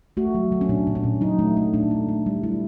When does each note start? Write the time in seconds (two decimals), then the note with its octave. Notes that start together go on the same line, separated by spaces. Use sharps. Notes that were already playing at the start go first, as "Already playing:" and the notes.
0.17 A3 F#4
0.35 F#3
0.52 F#3
0.61 C#4
0.69 A#2 D4
0.87 A#2
0.95 C#4
1.04 A#2
1.21 F#3 D#4
1.39 A3
1.57 A3
1.74 A#2 D4
1.91 A3
2.08 A3
2.26 G3
2.43 G3 E4